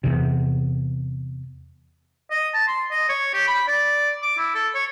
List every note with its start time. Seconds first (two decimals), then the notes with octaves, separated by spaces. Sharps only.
0.04 E2 C3
2.31 D#5
2.54 A5
2.68 C6
2.91 D#5
3.09 C#5
3.34 G4
3.47 B5
3.67 D5
4.22 D6
4.38 E4
4.55 A4
4.74 C#5